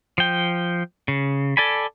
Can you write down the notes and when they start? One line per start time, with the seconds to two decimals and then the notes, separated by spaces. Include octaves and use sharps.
0.18 F3 G5
1.08 C#3
1.57 A4 D5 G#5 B5